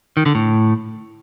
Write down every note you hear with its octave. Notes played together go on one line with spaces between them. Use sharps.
D#3
D3
A2